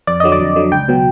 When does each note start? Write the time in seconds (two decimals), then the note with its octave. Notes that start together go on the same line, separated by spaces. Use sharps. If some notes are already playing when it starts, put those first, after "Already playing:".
0.07 F2 D5
0.20 D3 F#3 D#5
0.32 D5
0.40 F2
0.56 D3 F#3
0.72 C#2 G5
0.88 B2 F#3